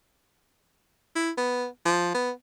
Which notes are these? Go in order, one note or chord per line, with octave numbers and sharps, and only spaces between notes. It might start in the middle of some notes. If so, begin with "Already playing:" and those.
E4
B3
F3
B3